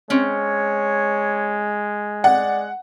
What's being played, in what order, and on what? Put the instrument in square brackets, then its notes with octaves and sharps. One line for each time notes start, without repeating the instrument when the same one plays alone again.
[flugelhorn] G#3 [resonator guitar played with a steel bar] C4 C#4 [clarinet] C#5
[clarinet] D5 [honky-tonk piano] F#5